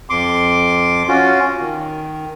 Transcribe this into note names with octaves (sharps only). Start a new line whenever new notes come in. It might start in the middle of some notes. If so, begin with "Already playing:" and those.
F2 C6 D6
C#4 F4 F#4
D#3